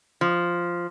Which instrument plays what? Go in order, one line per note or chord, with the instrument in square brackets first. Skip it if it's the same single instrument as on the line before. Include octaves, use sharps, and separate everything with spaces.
[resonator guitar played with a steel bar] F3